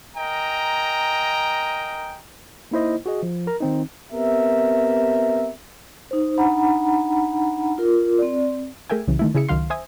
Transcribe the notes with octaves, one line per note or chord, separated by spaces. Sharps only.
A#4 D#5 G5 G#5 A#5
A#3 D#4 E4 C5 D#5
F#4 G#4 D#5
F3
A#4 A#5
D#3 C4 D#4
B3 C4 G4 A#4 E5
D#4 C5
D4 D#4 F#5 A#5 B5
F4 A#4
C4 D5
A3 G#4 A#4 E5 G5 G#5
C2 C#3 E3
D#3 A3 E4
C#3 E4 G#4 E5 C#7
C#2 D#3 F#3 F5 C6
C5 E5 G#5 D#6